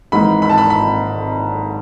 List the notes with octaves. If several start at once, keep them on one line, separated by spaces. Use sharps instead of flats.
G#1 G#2 E3 B5
B5
A5
B5
B5